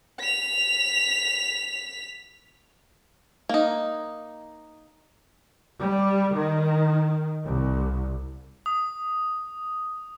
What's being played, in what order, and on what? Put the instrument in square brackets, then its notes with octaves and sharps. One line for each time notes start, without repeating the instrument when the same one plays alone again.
[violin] B6 F7
[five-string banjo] A#3 D#4
[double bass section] G3
D#3
C2
[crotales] D#6